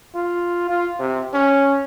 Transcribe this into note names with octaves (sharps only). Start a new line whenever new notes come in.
F4
F4
C3
C#4